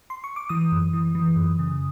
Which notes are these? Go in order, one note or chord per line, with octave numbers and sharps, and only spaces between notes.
C6
C#6
D6
E3 D#6
F#2
E3
E3
F#2
C#3